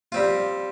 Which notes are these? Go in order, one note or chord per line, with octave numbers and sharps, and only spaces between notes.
G3 C4 F4